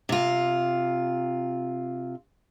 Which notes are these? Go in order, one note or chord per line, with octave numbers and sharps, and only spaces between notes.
C3 F4